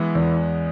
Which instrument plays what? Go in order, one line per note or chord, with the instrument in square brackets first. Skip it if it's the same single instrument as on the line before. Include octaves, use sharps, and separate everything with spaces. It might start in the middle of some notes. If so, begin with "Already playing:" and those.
Already playing: [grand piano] E3 [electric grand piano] G#3 B3
[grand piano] E2